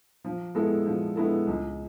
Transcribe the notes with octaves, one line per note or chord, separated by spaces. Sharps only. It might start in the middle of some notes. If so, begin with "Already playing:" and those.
F3
G#3 B3 E4 A4
F3
G#3 B3 E4 A4
C#2